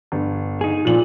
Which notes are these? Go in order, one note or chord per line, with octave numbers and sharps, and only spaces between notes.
G1
D#4 G#4
A#2 F3 F#7